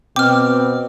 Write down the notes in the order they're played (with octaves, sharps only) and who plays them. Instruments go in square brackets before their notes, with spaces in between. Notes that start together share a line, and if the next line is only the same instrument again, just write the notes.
[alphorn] B2 [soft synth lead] C4 [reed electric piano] G5 [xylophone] D6 F6